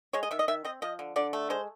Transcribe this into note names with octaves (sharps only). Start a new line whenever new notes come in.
G#3 C#5
D#5
D#3 E5
D#5
D#3 E5
C4 D#5
F3 D#5
D3
D3 D5
A3
G#3 C5